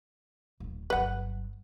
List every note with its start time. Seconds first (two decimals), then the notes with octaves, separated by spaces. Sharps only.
0.60 D1 D4
0.90 G1 F#3 B4 F#5